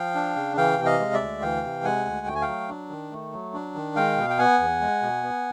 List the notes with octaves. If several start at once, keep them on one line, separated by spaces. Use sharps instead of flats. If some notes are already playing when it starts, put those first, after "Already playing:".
Already playing: F3 F5 G5
D4
C#3
E3 F5 G5
C3
D#5 F5
G#3
D5 E5
D2
E3 F5 G5
C3
G#3 F#5 G#5
D2
A3 G5
G#5
F5 G5
F#3
D4
D#3
A3
F#3
D4
D#3
G#3 F5 G5
B2
G5
B3 F#5 G#5
E2
G#3
B2
B3